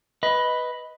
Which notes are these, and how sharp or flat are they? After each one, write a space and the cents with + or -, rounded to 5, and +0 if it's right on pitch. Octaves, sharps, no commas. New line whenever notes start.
B4 +0 D#5 +15